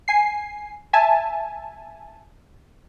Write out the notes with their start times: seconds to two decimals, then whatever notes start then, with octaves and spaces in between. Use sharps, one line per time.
0.08 G#5 C7
0.93 E5 G#5 A5